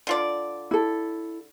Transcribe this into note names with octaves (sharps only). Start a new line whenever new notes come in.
D3 F4 D5
E4 A4